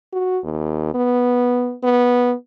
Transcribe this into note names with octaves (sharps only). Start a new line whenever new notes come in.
F#4
D#2
B3
B3